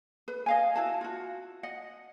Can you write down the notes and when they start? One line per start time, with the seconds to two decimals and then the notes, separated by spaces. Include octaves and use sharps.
0.28 B4
0.46 D#5 F5 G#5
0.76 E4 F#4 A5
1.01 F4 F#4
1.63 D#5 F#5